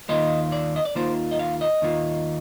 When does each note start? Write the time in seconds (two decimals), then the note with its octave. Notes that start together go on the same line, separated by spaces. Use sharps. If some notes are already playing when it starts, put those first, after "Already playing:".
0.09 D#2 D#3 A#3 F4 D#5
0.52 D5
0.76 D#5
0.85 D5
0.95 D#2 D#3 A#3 F4 C5
1.31 D#5
1.39 F5
1.61 D#5
1.82 D#2 D#3 A#3 F4